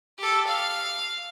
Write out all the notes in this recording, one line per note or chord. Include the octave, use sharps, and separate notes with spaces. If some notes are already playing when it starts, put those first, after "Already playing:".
G4 A4
F5